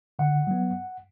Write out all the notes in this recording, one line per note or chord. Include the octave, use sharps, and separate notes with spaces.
D3 F#5
F#3 B3